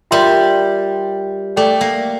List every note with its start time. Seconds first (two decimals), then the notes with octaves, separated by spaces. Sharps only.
0.11 G3 F4 A#4 E5 G5 C6
1.56 A3 A4 D5 G5 D6
1.81 A#3